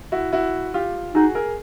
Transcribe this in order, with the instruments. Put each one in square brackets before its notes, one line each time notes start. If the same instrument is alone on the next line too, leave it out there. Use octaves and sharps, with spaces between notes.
[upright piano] E4 F#4
E4 F#4
F4 G4
[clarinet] D#4 [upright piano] F#4 G#4
[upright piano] G#4 A#4